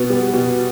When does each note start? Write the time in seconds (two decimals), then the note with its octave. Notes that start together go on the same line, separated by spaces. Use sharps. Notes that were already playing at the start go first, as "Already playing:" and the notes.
Already playing: B2 B3
0.10 G3
0.33 B2